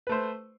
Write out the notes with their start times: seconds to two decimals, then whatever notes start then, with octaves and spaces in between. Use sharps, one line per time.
0.07 B4
0.09 A3
0.12 C5